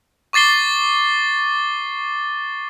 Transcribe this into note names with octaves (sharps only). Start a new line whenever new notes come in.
C#6 D6 A6 C7 G7